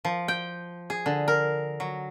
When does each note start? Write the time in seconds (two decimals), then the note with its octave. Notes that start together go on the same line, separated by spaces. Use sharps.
0.05 F3
0.28 G5
0.90 G#4
1.06 D3
1.28 A#4
1.80 F#3